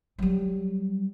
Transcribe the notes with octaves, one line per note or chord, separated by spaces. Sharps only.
F#3 G3